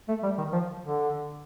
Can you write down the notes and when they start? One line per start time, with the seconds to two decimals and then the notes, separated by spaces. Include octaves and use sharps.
0.08 A3
0.23 G3
0.38 D#3
0.52 F3
0.82 D3